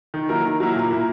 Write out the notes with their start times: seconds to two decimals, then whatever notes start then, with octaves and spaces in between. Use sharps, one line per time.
0.14 D#3
0.29 F#3 A#3 E4 A#4
0.44 D#3
0.60 F#3 A#3 E4 A#4
0.76 A#2
0.91 A#3 E4